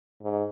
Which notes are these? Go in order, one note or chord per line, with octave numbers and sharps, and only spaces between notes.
G#2